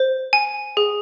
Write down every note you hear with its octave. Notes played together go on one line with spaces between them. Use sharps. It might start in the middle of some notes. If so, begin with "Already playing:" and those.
Already playing: C5
G#5
G#4